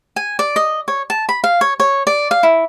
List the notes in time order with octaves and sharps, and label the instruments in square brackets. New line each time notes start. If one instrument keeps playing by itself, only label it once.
[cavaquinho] G#5
D5
D#5
C#5
A5
B5
F5
C#5
C#5
D5
F5
E4